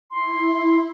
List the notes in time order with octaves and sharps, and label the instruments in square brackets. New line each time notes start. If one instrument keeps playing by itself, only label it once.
[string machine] E4 [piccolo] C6